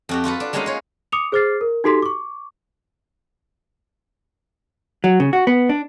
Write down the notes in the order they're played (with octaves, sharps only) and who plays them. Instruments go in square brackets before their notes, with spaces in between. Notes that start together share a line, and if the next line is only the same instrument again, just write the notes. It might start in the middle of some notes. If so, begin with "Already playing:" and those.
[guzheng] F2 F#4 G4
F4 F#4 A4 B4
D4
G3 G#3 A#3 C#4 D#4 F4
F4 C#5
[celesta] D6 D#6 C#7 F7
G#4 C5 D6 F6 A6 C7
A#4
D#4 F#4 G4 A4 C6 B6
C#6 D6
[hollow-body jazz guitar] F#3
C#3
F#4
B3
D4